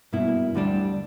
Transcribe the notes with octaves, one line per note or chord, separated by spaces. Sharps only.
G2 B2 A#3 E4
D2 D3 G3 D4